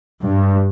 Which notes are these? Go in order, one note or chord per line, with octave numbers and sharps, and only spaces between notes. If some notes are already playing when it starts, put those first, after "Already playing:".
G2